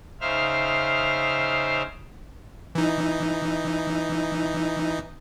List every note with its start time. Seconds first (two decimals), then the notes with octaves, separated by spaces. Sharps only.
0.21 C#3 D#4 C5 E5 F5 F6
2.75 E3 D#4